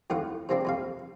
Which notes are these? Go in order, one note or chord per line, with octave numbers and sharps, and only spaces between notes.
F2 A2 D#3 F4 F#5
C3 F3 A#3 C4 D4
F2 C3 F5